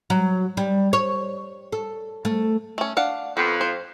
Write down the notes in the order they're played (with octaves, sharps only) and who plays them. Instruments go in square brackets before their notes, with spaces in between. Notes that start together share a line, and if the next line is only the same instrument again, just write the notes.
[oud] F#3
G3
C#5
A4
A3
[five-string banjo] A3 C#4
D4 F5 F#5
[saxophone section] F2 F3 [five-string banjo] B3
[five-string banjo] C5